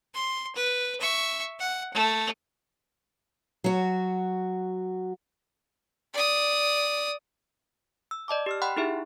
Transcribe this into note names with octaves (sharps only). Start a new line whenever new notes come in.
C6
B4
E5 C#6
F#5
A3
F#3 F#4
D5 D#6
E6
D5 D#5 A5 D6
G4 E6 F6
F#5 G5 B5 C6 F#6
D#4 E4 G4 G#4 E5